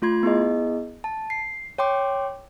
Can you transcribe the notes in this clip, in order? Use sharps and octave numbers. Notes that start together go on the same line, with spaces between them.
A3 F4 C6 G#6
B3 E4 G#4 D#5
A5
C7
C#5 G5 C6 D6